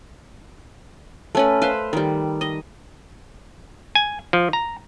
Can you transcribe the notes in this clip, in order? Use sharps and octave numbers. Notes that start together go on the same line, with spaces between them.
A3 C#4 B4
B4 C5 F5
D#3 G3
D#5
G#5
F3
A#5